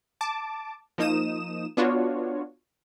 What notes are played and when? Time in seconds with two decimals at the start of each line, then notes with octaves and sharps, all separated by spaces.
0.21 A5 D6
0.98 F3 A#3 D#4 D#6 E7
1.77 B3 D4 F4 F#4 C#5